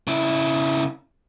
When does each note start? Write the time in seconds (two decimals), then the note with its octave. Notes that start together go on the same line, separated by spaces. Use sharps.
0.07 C#3 E4